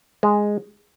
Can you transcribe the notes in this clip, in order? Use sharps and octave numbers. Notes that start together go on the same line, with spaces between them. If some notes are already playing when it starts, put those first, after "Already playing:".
G#3